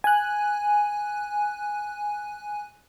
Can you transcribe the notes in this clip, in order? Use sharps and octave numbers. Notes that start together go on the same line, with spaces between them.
G#5 F#6